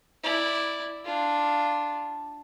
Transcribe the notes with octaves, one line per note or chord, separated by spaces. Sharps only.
E4 D5
D4 F4